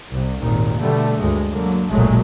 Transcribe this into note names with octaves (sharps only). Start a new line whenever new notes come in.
C2
G#1 D#2 A#2 D#3
B2 D3 G3 A3
D2 G2 G#3
D3 F#3 A#3
F#1 B1 A#2 F#3 G#3 A3